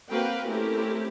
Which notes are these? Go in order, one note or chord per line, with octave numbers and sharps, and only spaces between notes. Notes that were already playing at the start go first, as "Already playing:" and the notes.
A#3 C4 F#4 B4 F5 G5
A3 C4 C#4 E4 G4 A#4